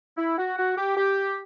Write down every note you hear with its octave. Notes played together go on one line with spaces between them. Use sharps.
E4
F#4
F#4
G4
G4